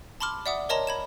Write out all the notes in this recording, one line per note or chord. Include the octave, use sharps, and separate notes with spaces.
A5 B5 C6 D6 F6
D5 E5 F#5 D6 D#6
A#4 C#5 D#5 A5 A#5 C6
B5 G#6 E7